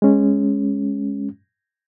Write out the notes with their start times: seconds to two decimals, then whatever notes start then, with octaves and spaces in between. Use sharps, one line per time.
0.02 G#3 C#4